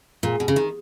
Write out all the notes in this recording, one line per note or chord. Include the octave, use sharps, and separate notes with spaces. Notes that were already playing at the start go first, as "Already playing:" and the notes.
A#2 G#4
B2
C#3
D#3